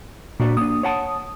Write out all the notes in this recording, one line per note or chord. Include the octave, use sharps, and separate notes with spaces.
A#2 D4 F#4 D5
A#3 D4 D#6
C#5 F#5 A5